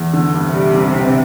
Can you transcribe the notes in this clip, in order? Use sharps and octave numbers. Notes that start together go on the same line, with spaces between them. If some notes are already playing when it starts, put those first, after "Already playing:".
Already playing: E2
D3
G2
C2 C3
G3
D3
D3